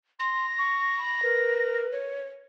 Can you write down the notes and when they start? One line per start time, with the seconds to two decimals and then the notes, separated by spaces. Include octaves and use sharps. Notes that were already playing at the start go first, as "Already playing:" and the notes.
0.20 C6 A#6
0.58 C#6
0.98 B5
1.23 A#4 B4
1.92 C#5